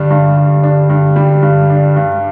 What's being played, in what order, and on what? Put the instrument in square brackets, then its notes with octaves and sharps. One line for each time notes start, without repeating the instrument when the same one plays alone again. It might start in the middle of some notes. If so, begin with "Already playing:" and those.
Already playing: [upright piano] G2 G3 D4 [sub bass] D3
[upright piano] G2
G2
D4
G2
G3
G2
D4
G2